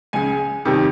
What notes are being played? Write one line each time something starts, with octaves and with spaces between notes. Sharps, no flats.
C#2 C#3 G#3 G#5
F2 C3 D#3 G3